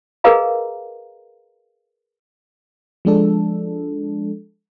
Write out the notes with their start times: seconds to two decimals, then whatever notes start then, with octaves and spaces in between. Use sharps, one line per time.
0.24 G#4 A#4 B4 D#5 F5 A#5
3.05 F3 G#3 D4 A4